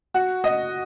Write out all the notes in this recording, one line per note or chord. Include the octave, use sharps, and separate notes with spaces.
F#4
D#5